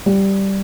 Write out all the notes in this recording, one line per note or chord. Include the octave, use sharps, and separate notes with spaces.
G3